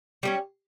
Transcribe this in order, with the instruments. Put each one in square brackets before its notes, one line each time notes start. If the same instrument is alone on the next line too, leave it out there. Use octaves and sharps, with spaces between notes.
[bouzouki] G3 A#3 C#4